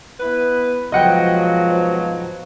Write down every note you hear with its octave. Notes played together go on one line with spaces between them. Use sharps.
B3 E4 B4
G#2 B2 F3 F#3 D#5 F#5 G5